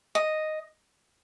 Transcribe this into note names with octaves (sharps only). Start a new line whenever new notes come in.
D#5